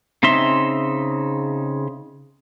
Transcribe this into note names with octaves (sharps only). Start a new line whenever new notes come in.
C#3 C4 D#4 E5 C6